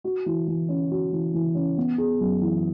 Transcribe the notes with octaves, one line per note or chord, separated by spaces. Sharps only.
F#4
E3
E3
C#4
F#4
E3
E3
C#4
B3
G#4
F#2
E3